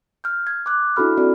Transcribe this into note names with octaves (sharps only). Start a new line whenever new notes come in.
F6 G6
G#6
D6 F#6
D4 E4 F#4 A4 B5 F6
C4 F#4 A4 D5